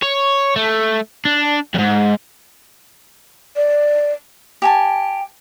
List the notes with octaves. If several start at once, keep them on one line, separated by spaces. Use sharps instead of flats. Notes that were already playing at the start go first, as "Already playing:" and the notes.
C#5
A3
D4
F2 G#2
D5
G4 G#5 A5